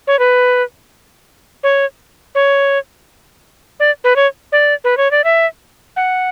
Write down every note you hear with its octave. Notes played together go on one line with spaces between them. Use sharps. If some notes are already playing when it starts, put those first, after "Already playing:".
C#5
B4
C#5
C#5
D5
B4
C#5
D5
B4
C#5
D5
E5
F#5